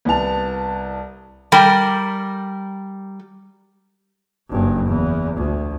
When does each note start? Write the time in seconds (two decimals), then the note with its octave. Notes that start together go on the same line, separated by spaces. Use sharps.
0.05 C2 B3 E4 B4 A5 F7
1.52 G3 A#4
4.50 F#1 G2
4.86 E2
5.37 D2